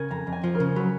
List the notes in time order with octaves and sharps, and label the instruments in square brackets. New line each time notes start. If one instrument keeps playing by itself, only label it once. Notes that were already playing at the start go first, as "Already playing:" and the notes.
Already playing: [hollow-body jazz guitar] C#3 [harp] A#4 G#5
[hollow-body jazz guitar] F2 [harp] A#5
[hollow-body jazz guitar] F2
[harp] G#5
[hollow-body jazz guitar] F3
[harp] A#4
[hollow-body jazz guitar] C#3
[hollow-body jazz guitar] F#3 [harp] B4